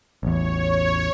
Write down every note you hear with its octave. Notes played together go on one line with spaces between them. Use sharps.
A1 E2 C#5